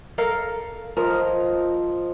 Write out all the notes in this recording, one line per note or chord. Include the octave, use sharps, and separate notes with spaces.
A4 A#4 F5
F3 A#4 D#5